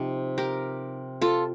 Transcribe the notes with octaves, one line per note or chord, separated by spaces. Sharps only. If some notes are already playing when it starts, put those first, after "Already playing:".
Already playing: C3 F3 D#4 G4
G4 A#4
F4 A4